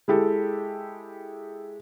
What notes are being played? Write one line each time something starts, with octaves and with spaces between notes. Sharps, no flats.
G#3 E4 G4 A4